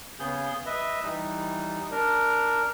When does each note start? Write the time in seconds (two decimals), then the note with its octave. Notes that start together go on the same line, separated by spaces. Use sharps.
0.19 C#3 B3 G#4 G6
0.66 B4 D#5 E5
1.03 E3 G3 D#4
1.91 D4 A#4